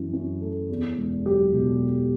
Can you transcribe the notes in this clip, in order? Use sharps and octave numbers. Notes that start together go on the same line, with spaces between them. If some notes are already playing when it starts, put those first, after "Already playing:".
Already playing: F#2 E3
F#2
A3
E2
E1
F#3 G4
B2